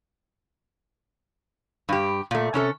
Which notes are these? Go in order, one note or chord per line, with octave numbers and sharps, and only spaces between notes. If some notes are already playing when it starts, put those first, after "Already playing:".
G2 G4
A#2 A3
C3 C#4 A4